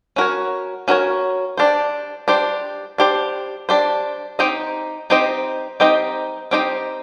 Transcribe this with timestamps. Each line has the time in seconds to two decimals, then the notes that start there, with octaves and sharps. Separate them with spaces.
0.16 C#4 F#4 A#4 C#5
0.88 C#4 F#4 A#4 C#5
1.57 D4 G4 C5
2.28 D4 G4 C5
2.98 D4 G4 C5
3.69 D4 G4 C5
4.39 C4 D#4 G4 C5 D#5
5.10 C4 D#4 G4 C5 D#5
5.80 C4 D#4 G4 C5 D#5
6.51 C4 D#4 G4 C5 D#5